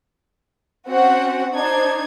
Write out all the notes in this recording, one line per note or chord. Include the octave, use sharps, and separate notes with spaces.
C4 C#4 F#4 F#5
D4 D#4 C5 G#6